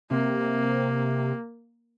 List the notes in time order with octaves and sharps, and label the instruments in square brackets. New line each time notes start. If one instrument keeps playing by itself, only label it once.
[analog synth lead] C3 [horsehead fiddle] A#3